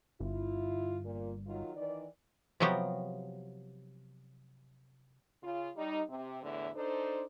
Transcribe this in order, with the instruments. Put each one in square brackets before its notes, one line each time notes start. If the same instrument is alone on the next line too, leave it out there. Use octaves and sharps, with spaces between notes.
[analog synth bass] G1 [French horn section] E4 F4
[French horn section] A#2
D#3 F#3 F4
D#3 E3 D5
[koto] C3 F3 F#3 B3 G4
[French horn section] C#3 F4
G3 D#4
C3
E2 A2 D3 E4
D4 D#4 A4 C5